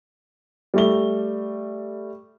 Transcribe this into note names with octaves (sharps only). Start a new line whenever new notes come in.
G3 A3 G7